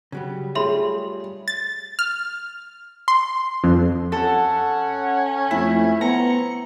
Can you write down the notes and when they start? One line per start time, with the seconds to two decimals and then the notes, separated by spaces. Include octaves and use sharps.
0.12 C#3 F#3 G3
0.55 G3 A3 F4 G#4 C#5 E5 B5 C6
1.48 A6
1.99 F6
3.08 C6
3.64 F2
4.12 C#4 A4 F#5
5.51 F2 A3 E4
6.01 B3 C4 A#5 C#7